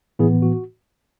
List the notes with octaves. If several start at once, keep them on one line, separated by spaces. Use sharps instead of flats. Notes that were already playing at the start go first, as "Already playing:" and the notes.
A2 E3 B3 E4 G#4
F#4